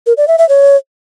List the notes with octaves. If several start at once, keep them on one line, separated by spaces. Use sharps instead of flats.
A#4
D5
E5
E5
C#5